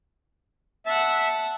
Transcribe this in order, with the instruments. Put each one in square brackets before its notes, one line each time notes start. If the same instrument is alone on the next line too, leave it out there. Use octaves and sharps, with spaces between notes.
[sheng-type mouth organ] E5 [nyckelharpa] F#5 A5